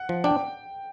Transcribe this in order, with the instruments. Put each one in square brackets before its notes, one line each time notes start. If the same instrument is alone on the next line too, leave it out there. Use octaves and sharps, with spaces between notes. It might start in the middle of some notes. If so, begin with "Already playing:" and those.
Already playing: [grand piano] F#5
[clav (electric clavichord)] F3
[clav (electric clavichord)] D4 [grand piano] G5